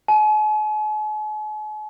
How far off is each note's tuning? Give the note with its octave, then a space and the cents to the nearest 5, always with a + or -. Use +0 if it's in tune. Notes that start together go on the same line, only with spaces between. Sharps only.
G#5 +45